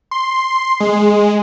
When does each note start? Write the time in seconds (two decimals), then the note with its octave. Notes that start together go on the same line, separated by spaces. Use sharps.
0.11 C6
0.80 G#3